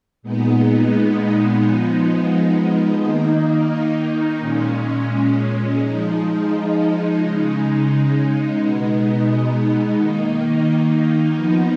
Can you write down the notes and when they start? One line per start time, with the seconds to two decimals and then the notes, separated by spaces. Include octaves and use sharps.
0.23 A#2 G#3 B3 D#4
1.62 F3 G#3 B3 D#4
3.01 D#3 A#3 D#4
4.40 A#2 G#3 C#4
5.79 F3 G#3 D#4
7.18 C#3 G#3 D#4
8.57 B2 G#3 B3 D#4
9.97 D#3 A#3 D#4
11.36 F3 B3 D#4